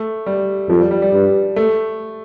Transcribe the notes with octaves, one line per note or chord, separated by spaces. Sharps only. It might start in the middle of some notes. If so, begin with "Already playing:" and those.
Already playing: A3
G3
F2 F3
G3
G3
G3
G2
A3